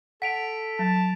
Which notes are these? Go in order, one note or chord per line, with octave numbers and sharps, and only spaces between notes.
A4 F#5 B6 D7 F7
F#3 A5